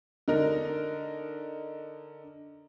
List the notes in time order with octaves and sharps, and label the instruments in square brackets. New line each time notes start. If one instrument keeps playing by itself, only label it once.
[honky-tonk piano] D3 D#4 A#4